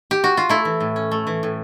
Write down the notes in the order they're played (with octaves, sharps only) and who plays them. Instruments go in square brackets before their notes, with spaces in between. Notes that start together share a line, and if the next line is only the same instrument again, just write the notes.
[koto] G4
F#4
F4
A3 E4
E3
A2
C#4
A3
E3
A2